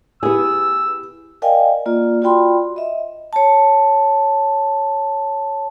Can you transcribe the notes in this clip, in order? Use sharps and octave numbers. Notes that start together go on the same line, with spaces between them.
B3 E4 G4 G#4 E6
A#4 D5 D#5 F5 G5 G#5
A#3 F4 D5
F4 F#4 D5 G5 B5 C6
D#5 E5
C#5 A5